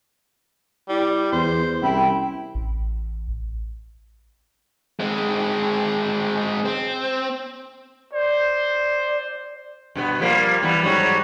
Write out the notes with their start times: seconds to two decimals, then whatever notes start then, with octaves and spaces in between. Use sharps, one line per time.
0.89 G3 E4
1.32 E2 C5
1.82 C2 C#4 E4 G5 B5
2.55 A1
5.00 G#3 C4
6.65 C4
8.13 C5 D5
9.95 G2 B2 B3
10.20 F3 G3 A#3
10.62 E3 G3 B3
10.83 G#2 F#3 G3